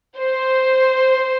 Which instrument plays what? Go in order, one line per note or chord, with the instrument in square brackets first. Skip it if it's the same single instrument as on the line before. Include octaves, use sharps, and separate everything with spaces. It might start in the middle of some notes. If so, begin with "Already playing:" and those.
[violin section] C5